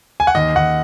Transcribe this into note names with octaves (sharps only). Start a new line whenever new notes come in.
G#5
F#5
D#2 D#5
D#2 F#5